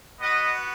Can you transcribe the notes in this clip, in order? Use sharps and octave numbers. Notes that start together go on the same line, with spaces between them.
B3 F#4 B4 D#5